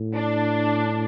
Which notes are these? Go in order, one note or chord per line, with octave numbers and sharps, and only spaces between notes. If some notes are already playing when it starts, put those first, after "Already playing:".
Already playing: A2
D4